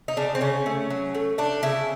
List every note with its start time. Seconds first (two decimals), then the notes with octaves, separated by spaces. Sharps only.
0.08 D#4
0.17 C#3 D4
0.35 C4
0.41 C#3 C#4
0.66 A3
0.90 F#3
1.15 A3
1.38 A3 D4
1.63 C#3 E4